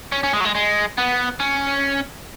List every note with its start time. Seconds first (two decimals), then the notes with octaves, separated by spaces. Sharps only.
0.12 C#4
0.23 C#4
0.33 G#3
0.40 F#3
0.45 G#3
0.55 G#3
0.98 B3
1.40 C#4